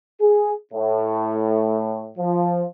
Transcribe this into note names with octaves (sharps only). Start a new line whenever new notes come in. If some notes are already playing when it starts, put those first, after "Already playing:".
G#4
A2
F3